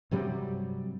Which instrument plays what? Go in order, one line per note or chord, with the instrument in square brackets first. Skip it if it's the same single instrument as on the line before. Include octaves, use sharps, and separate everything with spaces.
[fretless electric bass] G2 C3 F#3 G3